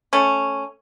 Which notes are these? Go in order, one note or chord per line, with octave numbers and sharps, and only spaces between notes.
A3 C#4